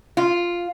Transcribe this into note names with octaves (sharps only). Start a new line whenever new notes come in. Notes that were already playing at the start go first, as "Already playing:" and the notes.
F4